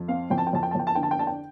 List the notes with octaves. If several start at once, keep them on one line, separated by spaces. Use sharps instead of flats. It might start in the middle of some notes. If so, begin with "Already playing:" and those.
Already playing: F2
C4 F5
F2 G5
A5
G5
F2 A5
G5
A5
F2 G5
A5
D3 G5
A5
G5
D4 A5
G5